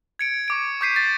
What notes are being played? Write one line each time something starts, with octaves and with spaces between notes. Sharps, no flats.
G#6 C#7 D7
C#6 D6 D7
C#6 D6 G6 B6 C7 D#7
A6